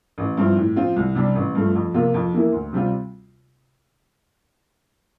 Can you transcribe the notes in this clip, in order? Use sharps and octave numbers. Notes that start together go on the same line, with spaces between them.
A1
G2 F3 C4 E4
A2
F3 C4 F4
C2
C3 G3 D4
A1
G2 F3 A3
F2
C3 F3 A#3 F4
F2
E3 A#3 E4
D2
C3 G3 C4 F4